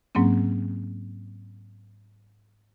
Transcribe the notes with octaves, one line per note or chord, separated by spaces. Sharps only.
G#2 F#3 A#3 C4 C#4